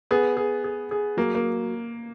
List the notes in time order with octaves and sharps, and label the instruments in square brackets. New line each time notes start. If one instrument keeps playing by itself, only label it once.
[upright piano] B3 [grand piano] G#4
[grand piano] G#4
G#4
G#4
[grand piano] F#3 [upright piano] A#3
[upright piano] A#3